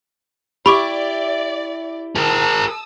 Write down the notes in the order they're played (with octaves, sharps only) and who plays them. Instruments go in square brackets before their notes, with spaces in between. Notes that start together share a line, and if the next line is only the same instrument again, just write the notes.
[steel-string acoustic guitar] E4 G4 [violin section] D5 [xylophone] B5 C#6 D6
[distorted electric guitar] G#4 A#4 [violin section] A5 D#6 E6